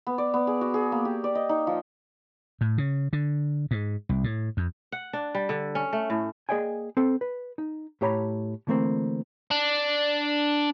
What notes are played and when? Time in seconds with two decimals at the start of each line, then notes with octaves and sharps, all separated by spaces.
0.07 B3
0.18 D5
0.34 B3
0.47 G#4
0.61 F#4
0.74 G#4
0.92 A#3
1.05 G4
1.24 D5
1.35 D#5
1.49 D#4
1.67 F3
2.61 A2
2.78 C#3
3.13 D3
3.71 G#2
4.09 C2
4.24 A2
4.57 F2
4.92 F#5
5.13 D4
5.35 G3
5.49 D3
5.75 C#4
5.93 A3
6.10 A2
6.49 A#3 G#4 D5 D#5 G5 G#5
6.97 C4 A4
7.21 B4
7.58 D#4
8.01 A2 G4 C#5 A#5 B5
8.67 D3 E3 A3 A#3 C4
9.51 D4